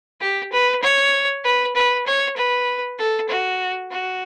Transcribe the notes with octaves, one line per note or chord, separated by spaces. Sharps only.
G4
B4
C#5
B4
B4
C#5
B4
A4
F#4
F#4